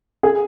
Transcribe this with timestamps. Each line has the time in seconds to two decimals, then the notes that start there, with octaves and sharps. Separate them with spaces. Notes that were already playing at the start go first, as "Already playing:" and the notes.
0.23 G#4